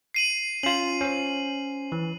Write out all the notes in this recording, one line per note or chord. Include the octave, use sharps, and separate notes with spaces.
C7 D#7 F#7
C#4 F4 C7 F#7
C#4 C5
E3